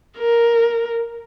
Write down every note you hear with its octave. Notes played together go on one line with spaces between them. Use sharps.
A#4